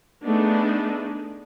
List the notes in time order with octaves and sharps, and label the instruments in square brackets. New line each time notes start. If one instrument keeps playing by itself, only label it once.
[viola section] A3 B3 D4 D#4 G#4